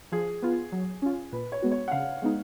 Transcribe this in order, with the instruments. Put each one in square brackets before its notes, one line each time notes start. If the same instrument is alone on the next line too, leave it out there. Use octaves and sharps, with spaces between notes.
[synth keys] F3 [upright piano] G#4
[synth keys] B3 F4
F#3
C#4 F4
[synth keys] A#2 [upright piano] B4
[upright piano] C#5
[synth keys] G#3 B3 F#4
[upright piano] C#5
F#5
[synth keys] C#3 [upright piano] F5
[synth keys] G#3 B3 D#4